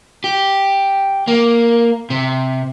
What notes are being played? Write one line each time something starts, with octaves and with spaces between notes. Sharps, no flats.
G4
A#3
C3